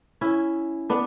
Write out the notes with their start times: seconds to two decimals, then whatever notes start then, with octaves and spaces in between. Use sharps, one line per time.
0.21 C#4 E4
0.90 B3 D4